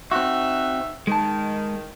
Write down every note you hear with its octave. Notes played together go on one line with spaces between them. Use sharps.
C4 D#4 F#4 E5
D#3 G#3 A5